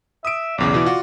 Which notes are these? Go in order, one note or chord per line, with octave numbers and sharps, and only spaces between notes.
E5 D#6 D7
B1 E2 C#3 D5
B2 E3 E4
F4 F#4